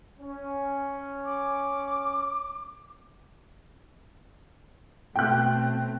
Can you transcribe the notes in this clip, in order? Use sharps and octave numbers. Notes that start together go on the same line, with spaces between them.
C#4
D6
B2 A3 C4 G5 F#6